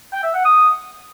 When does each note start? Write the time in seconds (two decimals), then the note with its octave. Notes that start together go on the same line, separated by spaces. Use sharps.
0.13 G5
0.23 E5
0.34 F#5
0.45 D#6